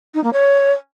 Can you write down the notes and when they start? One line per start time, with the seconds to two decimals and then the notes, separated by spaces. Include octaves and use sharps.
0.14 D#4
0.24 A#3
0.33 C#5